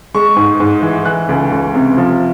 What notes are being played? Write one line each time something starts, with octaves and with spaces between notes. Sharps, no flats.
G#3 C#6
G#2
G#2
E3
E3 F#6
C#2
C#2
C3
F3